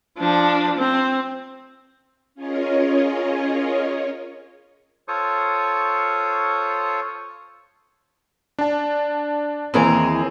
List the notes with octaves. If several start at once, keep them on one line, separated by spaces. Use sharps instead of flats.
F3 D4
C4
C#4 F4 G#4 A#4 C#5 D#5
F4 A4 C5 C#5 C#6 D#6
D4 A5
D#2 E3 C4 G#4 G#5 A#5